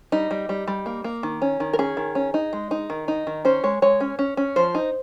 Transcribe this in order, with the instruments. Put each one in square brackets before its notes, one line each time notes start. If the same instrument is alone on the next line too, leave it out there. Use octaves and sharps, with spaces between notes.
[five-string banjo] G3 D#4
G3
G3
G3
A#3
A#3
D#3
C#4
D#3
A#4
C#4 G#4
D#3
C#4
D#4
G#3
D#4
D#3
D#4
D#3
C#4 C5
G#3 C#5
G#3 C#5
C#4
C#4
C#4
F3 C5
D#4